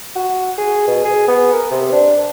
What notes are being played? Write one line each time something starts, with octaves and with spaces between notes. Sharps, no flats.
F#4
G#4
B2
G#4
B3
A#4
C3
D4